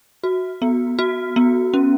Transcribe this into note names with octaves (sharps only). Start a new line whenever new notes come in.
F#4
B3
F#4
B3
C#4